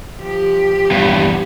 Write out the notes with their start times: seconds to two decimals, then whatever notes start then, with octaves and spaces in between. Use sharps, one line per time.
0.19 F3 G4
0.91 E2 G2